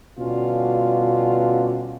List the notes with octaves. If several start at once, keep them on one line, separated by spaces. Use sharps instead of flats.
B2 D3 G3 C#4 F4